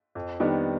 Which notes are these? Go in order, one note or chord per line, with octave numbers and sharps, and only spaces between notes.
F2
D#3 G3 B3 D4